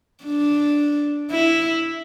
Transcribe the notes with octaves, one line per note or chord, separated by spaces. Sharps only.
D4
E4